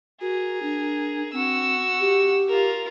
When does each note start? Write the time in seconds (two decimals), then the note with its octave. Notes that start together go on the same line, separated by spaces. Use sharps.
0.21 F#4 G#4 A#4
0.63 D4
1.33 C4 F#4 E6
2.00 G4
2.48 F4 A#4